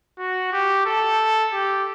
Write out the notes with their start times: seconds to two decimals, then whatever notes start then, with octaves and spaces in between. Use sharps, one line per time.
0.18 F#4
0.52 G4
0.86 A4
1.53 G4